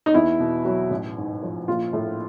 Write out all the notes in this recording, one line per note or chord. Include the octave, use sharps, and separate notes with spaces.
D#4
E2 E4
B2
F#3
A1
G#2
F3
A#1 F4
A2